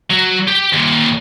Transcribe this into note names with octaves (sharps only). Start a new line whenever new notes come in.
F#3 F#4
G4 G5
D#2 A#2